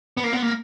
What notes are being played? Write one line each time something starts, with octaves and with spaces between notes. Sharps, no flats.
B3
A#3
B3
A#3